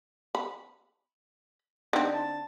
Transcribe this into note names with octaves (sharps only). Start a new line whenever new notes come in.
B5
D3 C4 D#4
A5